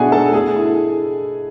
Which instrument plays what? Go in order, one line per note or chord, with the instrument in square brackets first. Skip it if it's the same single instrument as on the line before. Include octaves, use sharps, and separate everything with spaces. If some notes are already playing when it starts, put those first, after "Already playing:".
Already playing: [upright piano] B2 A3 [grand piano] D4 E4 F#4 G#4 F#5 G#5
[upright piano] A3 [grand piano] A4 A5
[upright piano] A3 [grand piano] G#4 G#5
[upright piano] E4